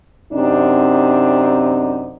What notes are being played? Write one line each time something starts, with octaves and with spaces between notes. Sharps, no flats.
F#2 C3 C4 D4 D#4